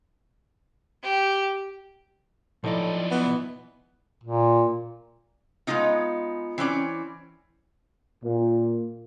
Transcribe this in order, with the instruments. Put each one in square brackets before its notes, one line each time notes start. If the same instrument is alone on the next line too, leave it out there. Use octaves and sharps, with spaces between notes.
[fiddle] G4
[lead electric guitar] B1 D5 [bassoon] A2 [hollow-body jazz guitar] F3 D#4 E4
[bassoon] E3 [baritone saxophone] B3
[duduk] A#2
[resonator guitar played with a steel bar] G#3 A3 B3 D#4 F4
E3 C4 C#4 D5
[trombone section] A#2